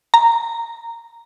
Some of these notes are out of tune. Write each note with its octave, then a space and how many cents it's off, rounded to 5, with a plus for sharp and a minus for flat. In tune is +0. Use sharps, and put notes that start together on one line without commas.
A#5 -10